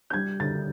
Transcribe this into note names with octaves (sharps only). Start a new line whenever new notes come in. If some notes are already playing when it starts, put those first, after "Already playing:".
G6
G3 G#6
D3 A6